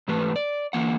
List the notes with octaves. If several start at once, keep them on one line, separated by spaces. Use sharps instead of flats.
G#2 E3 A3 G4 B4
D5
D3 E3 A#3 F#5